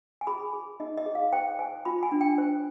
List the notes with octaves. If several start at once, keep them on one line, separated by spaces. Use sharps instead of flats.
G#5
G#4 B5
G#4
D#4 D#5
D#5
G#4
F5
C5 G5
C5 G#5
F4 B5
G#5
D4
G5
C5